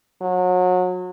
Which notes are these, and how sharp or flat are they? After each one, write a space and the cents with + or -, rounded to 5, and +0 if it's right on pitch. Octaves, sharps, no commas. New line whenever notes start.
F#3 -30